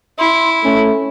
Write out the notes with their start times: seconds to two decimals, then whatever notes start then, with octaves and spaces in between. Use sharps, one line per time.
0.19 E4 C6
0.64 A3 C#4